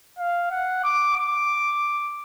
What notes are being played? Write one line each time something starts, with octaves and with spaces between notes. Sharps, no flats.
F5
F#5
D6
D6